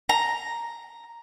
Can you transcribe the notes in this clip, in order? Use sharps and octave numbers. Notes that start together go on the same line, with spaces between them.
A#5